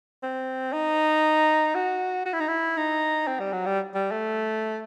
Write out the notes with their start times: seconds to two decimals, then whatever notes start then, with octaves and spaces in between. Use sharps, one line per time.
0.23 C4
0.73 D#4
1.75 F#4
2.26 F#4
2.33 E4
2.40 D#4
2.48 E4
2.77 D#4
3.27 C4
3.39 G3
3.53 F#3
3.66 G3
3.95 G3
4.11 A3